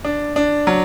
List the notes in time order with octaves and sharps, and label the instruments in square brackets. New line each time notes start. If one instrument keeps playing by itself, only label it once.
[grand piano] D4
D4
F#3